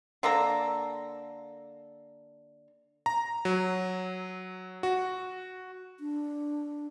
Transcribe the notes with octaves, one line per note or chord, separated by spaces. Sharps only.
D3 A#3 A4 A#5
A#5
F#3
F#4
D4